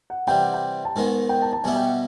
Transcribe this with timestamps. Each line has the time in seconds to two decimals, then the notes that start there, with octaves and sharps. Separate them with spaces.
0.10 F#5
0.27 C3 E3 G3 G5
0.40 F#5
0.54 G5
0.85 A5
0.96 G#2 D#3 G#3 B3 G#5
1.29 G5
1.42 A5
1.53 A5
1.64 B2 G3 B3 E4 G4 G#5
1.76 G5
1.87 F#5